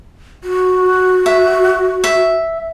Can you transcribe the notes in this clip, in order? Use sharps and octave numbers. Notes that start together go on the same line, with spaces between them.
F#4
E5
E5